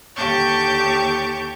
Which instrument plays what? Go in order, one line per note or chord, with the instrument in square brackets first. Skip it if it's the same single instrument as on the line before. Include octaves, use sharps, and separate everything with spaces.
[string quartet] D#2 D3 G4 A5 C#6 G6